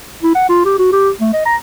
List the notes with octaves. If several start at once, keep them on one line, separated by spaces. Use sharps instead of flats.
E4
F#5
F4
G4
F#4
G4
A3
D#5
A#5